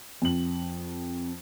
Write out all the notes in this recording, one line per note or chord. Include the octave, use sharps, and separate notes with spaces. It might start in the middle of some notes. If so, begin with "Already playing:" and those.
F2 F#7